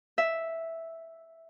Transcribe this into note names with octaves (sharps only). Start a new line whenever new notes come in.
E5